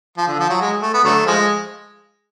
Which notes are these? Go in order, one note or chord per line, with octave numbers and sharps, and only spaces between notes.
F3
D3
F3
F#3
G#3
A3
B3
D3 F#3 A3
F3 G#3